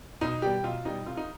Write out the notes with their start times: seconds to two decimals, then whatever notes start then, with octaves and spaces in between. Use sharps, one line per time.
0.21 B1 D#4
0.42 B2 G3 G4
0.64 B1 F4
0.85 B2 G3 D#4
1.06 C2 F4
1.17 D#4